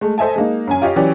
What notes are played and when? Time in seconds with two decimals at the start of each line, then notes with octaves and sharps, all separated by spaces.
0.01 G#3 A3
0.18 A4 C5 D#5 E5 G#5 A5
0.36 G#3 A#3 D#4
0.67 F#2 C#4 G#5
0.82 F4 G4 C#5 D#5 F5
0.96 E3 F#3 C#4 G4 D5